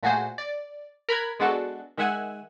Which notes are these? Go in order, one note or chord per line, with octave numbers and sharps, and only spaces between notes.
A#2 A3 F#4 G#4 C5
D5
A#4 B5 F#6 G#6
G#3 B3 D4 F#4 A4
D#3 G#3 E5 F#5 G#5 E6